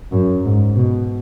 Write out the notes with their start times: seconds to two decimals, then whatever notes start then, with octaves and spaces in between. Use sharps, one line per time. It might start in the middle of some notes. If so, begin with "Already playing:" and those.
0.12 F#2
0.44 G#2
0.75 B2